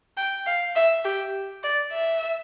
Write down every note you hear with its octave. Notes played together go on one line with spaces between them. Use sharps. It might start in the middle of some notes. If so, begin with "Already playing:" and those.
G5
F5
E5
G4
D5
E5